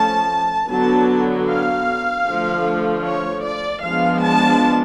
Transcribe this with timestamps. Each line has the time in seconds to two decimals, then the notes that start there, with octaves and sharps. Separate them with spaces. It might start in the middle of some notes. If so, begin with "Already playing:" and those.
Already playing: F3 A3 C#4 A5
0.69 D3 F#3 B3 A5
1.48 F5
2.26 D3 F3 A3
3.05 C#5
3.44 D5
3.84 F3 G#3 B3 D4 F5
4.23 A5